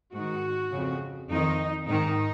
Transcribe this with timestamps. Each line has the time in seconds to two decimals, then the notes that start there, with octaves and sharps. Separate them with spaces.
0.13 G#2 D#3 F#4
0.71 F2 C#3
1.30 F2 D#3 D#4
1.87 G#2 D#3 D#4